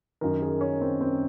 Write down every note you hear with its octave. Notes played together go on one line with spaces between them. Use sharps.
F#2 D#3 A#4
G#4
C#4
C4
C4